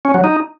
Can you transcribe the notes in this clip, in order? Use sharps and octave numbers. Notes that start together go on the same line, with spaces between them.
C#4
F#3
D#4